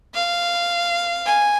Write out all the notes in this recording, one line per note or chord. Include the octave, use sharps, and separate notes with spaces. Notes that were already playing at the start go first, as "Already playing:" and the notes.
F5
G#5